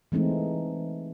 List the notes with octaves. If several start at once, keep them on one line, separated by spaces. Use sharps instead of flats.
E3 G#3 A3 C4 D#4